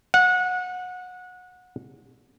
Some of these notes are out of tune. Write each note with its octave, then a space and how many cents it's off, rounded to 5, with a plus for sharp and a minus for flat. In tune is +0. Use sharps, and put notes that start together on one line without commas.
F#5 -25